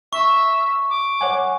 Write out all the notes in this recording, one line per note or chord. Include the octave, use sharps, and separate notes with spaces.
E5 C#6
D6
C#5 F#5 G#5